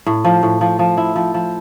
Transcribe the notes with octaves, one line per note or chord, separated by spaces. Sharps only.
A2
F3
A2
F3
F3
E4
F3
F3